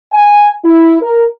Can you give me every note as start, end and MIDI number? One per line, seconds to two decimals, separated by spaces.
0.13 0.51 80
0.64 0.95 64
1.02 1.25 70